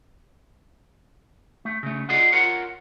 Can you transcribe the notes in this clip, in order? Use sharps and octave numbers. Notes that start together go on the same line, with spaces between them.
A3
C#3 A3
F4 G#4 D5 D#5 F#5
F4 A#4 C#5 F#5